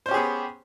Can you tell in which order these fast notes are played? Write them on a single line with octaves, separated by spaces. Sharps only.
C5 C#4 G4 G#4 B3